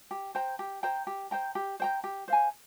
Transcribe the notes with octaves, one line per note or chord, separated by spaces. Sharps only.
G4
C5 G5 A#5
G4
C5 G5 A#5
G4
C5 G5 A#5
G4
C5 G5 A#5
G4
C5 F5 G#5